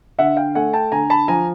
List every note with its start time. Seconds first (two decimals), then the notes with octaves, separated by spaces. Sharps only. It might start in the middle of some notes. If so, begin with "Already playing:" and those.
0.19 D3 E5 F#5
0.37 F5 G5
0.55 A3 F#5 G#5
0.73 G5 A5
0.92 D3 G#5 A#5
1.10 A5 B5
1.28 F3 G#5 A#5